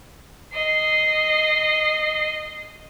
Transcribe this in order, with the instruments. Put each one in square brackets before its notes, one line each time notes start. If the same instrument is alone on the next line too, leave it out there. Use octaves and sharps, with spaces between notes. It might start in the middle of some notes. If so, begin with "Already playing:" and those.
[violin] D#5 C7